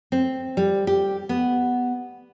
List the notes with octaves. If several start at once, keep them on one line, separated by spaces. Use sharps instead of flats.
C4
G3
G4
B3